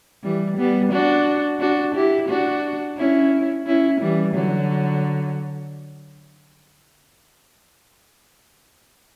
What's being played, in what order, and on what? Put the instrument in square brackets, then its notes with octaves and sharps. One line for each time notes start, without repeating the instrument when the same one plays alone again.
[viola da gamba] E3 G3
G3 B3
D4 F#4
D4 F#4
E4 G4
D4 F#4
C#4 E4
C#4 E4
E3 G3
D3 F#3